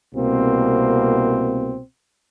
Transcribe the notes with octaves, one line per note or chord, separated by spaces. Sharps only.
C2 B2 A#3 C4